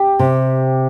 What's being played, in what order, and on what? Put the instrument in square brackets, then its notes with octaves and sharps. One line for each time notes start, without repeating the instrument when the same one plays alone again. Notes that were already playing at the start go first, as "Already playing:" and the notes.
Already playing: [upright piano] G4
[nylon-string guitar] C3